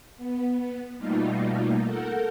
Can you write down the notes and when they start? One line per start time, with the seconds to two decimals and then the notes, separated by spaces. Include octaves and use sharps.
0.17 B3
0.98 B2 G3 A3 A#3 D#4 F4
1.83 A4 A#4 F#5 G6